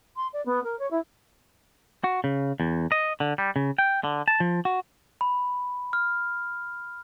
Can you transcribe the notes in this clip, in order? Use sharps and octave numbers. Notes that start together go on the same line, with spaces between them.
C6
D5
B3
A#4
C#5
E4
F#4
C#3
E2
D#5
D3
G3
C#3
G5
D3
A5
F3
F#4
B5
F6